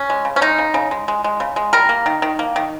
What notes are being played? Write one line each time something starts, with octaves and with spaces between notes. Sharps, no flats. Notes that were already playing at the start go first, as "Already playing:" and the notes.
Already playing: C#4
G#3
C#3
C#4
G#3 D#4
C#3
C#3
G#3
G#3
G#3
C#3
G#3
G3 A#4
A#3
D#3
D#3
A#3
D#3